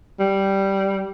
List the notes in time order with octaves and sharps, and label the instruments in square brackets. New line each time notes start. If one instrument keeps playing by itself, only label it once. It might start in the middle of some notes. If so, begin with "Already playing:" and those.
[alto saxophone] G3